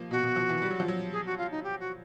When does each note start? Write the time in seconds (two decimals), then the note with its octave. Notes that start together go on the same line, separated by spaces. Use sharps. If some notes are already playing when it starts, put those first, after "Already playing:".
Already playing: F3 A#3
0.11 B2 F#4
0.23 B2
0.36 F3
0.49 E3
0.62 G3
0.71 F#3
0.80 F3
0.88 F#3
1.12 G#4
1.25 F#4
1.37 F4
1.51 D#4
1.63 G4
1.80 F#4